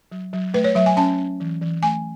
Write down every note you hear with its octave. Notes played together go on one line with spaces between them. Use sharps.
F#3
F#3
A3 B4
C#5
F#3 E5
G#5
C#4 A5
C#4
E3
E3
A3 G#5